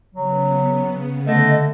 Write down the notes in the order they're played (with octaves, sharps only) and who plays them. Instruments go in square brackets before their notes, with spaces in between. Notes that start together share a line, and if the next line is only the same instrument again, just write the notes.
[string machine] C#3 B3 [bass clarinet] F#3
[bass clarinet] D3 [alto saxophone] A3 [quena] D#5